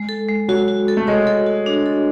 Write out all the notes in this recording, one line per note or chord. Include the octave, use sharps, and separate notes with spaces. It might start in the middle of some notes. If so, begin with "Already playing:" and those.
Already playing: G#3
A4
G#3
F#3 F#4
F#4
A4
A3
G#3 C#5
A4
F#4
D4
A4